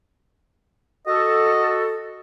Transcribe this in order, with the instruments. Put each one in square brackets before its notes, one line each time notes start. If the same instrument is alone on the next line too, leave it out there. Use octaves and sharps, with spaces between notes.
[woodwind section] F#4 A4 [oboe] D#5